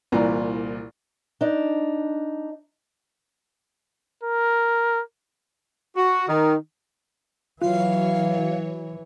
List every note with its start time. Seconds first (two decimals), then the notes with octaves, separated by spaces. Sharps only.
0.12 C2 A#2 E3 D5 A#5
1.41 D4 D#4
4.23 A#4
5.96 F#4
6.28 D#3
7.62 E3 F#3 F4 C#5 F5